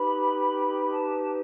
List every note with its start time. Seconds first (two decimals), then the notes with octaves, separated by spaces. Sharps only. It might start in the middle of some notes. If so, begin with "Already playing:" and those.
Already playing: D#4 G4 B4 B5
0.90 A5